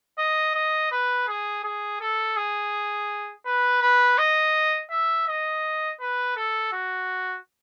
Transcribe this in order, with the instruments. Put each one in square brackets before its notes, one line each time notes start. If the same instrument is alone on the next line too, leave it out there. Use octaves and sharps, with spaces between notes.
[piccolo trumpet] D#5
D#5
B4
G#4
G#4
A4
G#4
B4
B4
D#5
E5
D#5
B4
A4
F#4